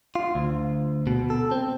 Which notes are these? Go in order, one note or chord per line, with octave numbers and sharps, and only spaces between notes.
F4
D2
B2
A4
C4